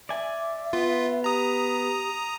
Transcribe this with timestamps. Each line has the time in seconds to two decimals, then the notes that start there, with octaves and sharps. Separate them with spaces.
0.09 D5 E5 G#5
0.73 B3 F4
1.24 G4 A#5 D#6